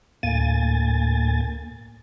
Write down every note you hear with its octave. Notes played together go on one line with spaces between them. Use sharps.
D2 A2 A#3 G#5 A6